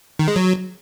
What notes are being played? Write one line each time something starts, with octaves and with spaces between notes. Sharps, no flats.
D#3
G#3
F#3